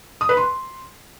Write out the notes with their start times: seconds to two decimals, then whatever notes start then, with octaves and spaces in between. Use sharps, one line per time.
0.21 D#6
0.29 B4
0.37 C6